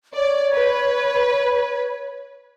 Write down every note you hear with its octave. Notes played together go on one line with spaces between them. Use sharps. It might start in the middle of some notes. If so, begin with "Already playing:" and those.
C#5 D5
B4